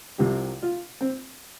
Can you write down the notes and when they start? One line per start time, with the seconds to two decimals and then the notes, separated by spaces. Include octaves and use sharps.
0.18 C2 C3 F3 G4
0.63 F4
1.01 C4